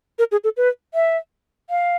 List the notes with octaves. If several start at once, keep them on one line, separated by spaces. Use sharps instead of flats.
A#4
G#4
A4
B4
E5
F5